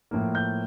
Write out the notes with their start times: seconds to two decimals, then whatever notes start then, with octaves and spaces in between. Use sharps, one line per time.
0.11 A2 F3 A#3
0.35 G6